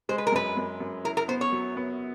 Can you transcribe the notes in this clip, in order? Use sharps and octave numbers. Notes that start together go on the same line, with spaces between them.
G#3 C5
B4
A#4
F#2 B4
F#2
F#2
E4 A#4
A#4
B3 C5
C#5
F#3
B3